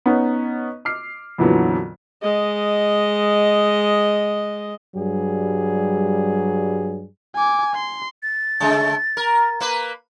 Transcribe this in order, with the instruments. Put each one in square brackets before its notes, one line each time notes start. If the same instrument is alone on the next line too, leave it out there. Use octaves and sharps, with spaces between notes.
[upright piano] B3 C#4 D#4
D6 F6 C7
F2 A#2 D3 E3 F#3 B3
[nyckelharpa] G#3 D#5
[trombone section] G2 F#3 G3 G#4
[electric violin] G#5 D6
C6
[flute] A6
[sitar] C#3 G#3 A3
A#4
A#3 B4